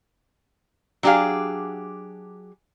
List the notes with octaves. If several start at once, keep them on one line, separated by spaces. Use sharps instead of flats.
F#3 D4 G4 G#4 F5